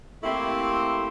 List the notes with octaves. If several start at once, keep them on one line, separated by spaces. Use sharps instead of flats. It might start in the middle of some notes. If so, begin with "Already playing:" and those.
A3 A#3 C4 E4 G4